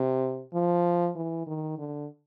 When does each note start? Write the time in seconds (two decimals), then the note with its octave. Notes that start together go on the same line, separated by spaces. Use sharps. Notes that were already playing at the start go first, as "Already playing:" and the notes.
Already playing: C3
0.54 F3
1.16 E3
1.47 D#3
1.78 D3